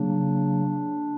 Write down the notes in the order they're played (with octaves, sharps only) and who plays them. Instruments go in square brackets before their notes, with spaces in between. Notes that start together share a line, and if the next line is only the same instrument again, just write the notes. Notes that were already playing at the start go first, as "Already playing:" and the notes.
Already playing: [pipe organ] C#3 F#3 A#3 D4